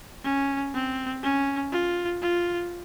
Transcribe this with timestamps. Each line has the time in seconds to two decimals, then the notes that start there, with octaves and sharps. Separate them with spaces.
0.24 C#4
0.74 C4
1.23 C#4
1.72 F4
2.21 F4